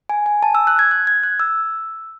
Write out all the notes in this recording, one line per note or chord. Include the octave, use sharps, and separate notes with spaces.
G#5
G#5
A5
E6
F#6
G#6
F#6
G#6
F#6
E6